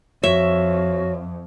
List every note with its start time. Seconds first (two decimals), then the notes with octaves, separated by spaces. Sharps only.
0.24 F2 F#4 C#5 E5